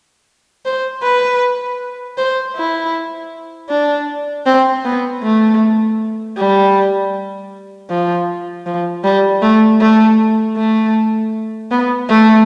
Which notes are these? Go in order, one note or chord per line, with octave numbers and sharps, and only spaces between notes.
C5
B4
C5
E4
D4
C4
B3
A3
G3
F3
F3
G3
A3
A3
A3
B3
A3